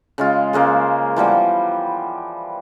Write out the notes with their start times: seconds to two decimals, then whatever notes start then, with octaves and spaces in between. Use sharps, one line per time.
0.18 C#3 G#3 F4
0.53 C#3 G#3 A#3 C5
1.16 E3 F3 G3 B3